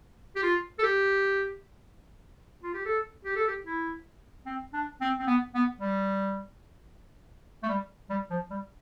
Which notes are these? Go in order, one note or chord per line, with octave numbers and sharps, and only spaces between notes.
G4
F4
A4
G4
F4
G4
A4
G4
A4
G4
E4
C4
D4
C4
C4
B3
B3
G3
A3
G3
G3
F3
G3